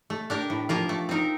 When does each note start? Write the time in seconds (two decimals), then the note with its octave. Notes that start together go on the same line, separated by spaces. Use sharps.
0.10 A3
0.30 D4 G4 A#4
0.50 A2
0.69 F3 A#3 F4 A#4
0.89 A3
1.09 C4 D#4 A#4